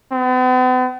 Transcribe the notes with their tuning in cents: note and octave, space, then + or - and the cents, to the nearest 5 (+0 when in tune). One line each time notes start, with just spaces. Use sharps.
B3 +45